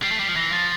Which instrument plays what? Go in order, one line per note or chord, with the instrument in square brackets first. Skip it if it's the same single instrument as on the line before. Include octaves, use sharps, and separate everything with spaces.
[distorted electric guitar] G3 [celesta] C7
[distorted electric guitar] A3
G3
F3
[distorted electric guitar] E3 [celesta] A#6
[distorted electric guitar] F3 [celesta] A6